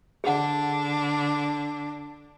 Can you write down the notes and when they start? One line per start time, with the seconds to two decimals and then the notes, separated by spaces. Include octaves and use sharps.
0.24 D3 D4 G#4 F#5